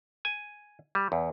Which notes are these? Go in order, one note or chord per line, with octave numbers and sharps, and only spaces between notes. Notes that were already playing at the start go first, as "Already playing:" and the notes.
G#5
G3
E2